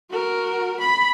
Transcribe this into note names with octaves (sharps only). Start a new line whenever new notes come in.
F#4 A#4
B5